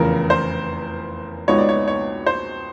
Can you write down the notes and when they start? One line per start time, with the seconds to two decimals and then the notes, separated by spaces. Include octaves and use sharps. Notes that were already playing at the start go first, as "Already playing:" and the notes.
Already playing: F1 E2 C#3 F3 A#4
0.30 C5
1.48 C#2 B2 G#3 B3 D#4 C#5
1.58 D5
1.69 C#5
1.88 C#5
2.26 C5